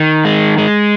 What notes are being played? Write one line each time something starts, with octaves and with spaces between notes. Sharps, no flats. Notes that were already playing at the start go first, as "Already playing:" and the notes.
Already playing: D#3
G#3
G#3